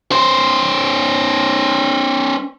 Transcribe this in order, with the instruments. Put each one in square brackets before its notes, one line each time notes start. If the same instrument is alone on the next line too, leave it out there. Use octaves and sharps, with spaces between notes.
[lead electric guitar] C#4 C5